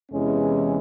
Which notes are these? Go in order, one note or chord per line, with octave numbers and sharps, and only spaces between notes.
E2 C3 E3 G#3 C#4